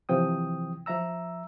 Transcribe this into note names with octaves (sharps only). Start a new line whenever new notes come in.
C3 E3 F3 G5 D#6
F3 E5 A#5 E6